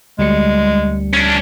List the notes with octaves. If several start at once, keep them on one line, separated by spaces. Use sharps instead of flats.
D2 G3 G#3 C#7
C#4 D4